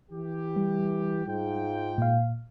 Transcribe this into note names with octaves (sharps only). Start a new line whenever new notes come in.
E3 G4
G3
G#2 F4 G5
A#2 F5